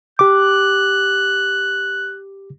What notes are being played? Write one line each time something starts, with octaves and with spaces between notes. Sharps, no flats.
G4 D6 F#6